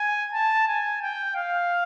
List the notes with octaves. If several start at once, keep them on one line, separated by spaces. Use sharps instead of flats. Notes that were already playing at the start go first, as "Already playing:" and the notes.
Already playing: G#5
A5
G#5
G5
F5